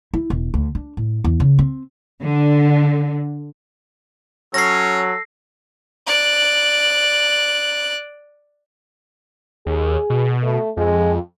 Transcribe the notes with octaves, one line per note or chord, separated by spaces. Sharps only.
E4
E1
D2
D4
A2
E2
C#3
C4
D3
F#3 C#4 A4 A#6 C7
D5 F#6
D#2 G#4
B2
A3
F2 G#3